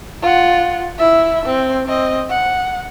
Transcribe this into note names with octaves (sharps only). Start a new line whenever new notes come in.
F4 F#5
E4 E5
C4
C4 D#5
F#5